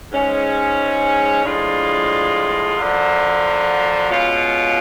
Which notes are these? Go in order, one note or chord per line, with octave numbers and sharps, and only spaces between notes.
G#2 G#3 C#4
A2 F3 G#3 D4 F4
F#2 D3 F3
B2 G#3 C#4 F4